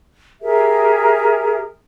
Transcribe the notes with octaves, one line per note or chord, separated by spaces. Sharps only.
G4 G#4 A#4 E5